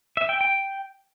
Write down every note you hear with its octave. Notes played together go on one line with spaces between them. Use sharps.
E5
G5
G5